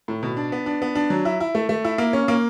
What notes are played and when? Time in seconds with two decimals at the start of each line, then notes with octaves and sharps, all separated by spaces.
0.08 A2
0.23 B2
0.37 D4
0.52 B3
0.66 D4
0.82 B3
0.95 D4
1.10 F#3
1.25 E4
1.40 E4
1.55 A3
1.69 A3
1.84 E4
1.98 A#3
2.13 C#4
2.28 A#3